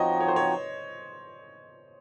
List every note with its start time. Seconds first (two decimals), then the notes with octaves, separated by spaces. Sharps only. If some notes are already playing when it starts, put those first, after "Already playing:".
Already playing: F3 C4 D#4 F#4 C#5 D#5
0.20 C#5
0.28 C5
0.36 C#5